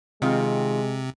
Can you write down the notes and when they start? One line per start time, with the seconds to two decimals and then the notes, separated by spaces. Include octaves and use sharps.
0.22 C3 D#3 G#3 C4 F4